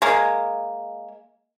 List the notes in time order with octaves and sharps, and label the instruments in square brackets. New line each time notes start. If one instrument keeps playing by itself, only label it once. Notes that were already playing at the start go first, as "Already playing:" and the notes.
[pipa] G#3 A#3